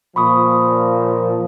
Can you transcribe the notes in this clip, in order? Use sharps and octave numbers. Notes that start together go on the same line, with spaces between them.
A#2 F3 B5 C#6 D#6